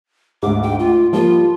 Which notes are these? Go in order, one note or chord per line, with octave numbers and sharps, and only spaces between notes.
D2 G#2 D6
G5
F4
F3 G3 A#3 F4